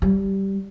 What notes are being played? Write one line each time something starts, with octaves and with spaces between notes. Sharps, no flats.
G3